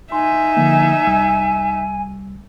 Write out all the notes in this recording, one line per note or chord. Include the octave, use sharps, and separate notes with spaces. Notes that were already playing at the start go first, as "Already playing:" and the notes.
D#4 E5 G#5 C6
D3 F3 A#3
C2 G3 E6